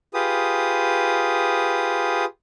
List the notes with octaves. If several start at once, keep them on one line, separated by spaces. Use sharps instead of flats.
F4 G4 G#4 B4 D#6